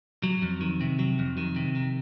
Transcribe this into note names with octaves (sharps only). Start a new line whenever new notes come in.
F#3
F2
D#3
C3
F#3
F2
D#3
C3
D#3